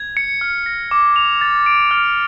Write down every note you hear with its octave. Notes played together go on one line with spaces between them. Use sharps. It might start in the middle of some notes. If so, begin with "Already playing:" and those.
Already playing: G#6
C#7
F6
A#6
D6
F7
A6
D7
F6